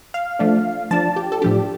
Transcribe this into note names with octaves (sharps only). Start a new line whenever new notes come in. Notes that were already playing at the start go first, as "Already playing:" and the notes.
F5
F3 A3 D4
F3 D4 A5
G4
A4
A2 F3 D4 G4